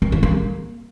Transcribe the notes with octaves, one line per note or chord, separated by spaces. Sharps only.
D#3
E4
A#3